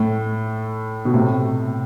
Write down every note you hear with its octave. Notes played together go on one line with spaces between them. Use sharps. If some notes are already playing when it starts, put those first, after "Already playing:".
Already playing: A2
B2
A2 C3